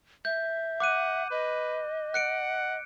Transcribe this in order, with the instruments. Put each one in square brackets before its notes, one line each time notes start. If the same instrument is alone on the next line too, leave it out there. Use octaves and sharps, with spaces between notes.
[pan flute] E5 [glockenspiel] G6
[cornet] F#5 [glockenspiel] D6 F#6 D#7
[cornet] B4 [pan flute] D#5
[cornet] F#5 [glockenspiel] F#6 C#7 D7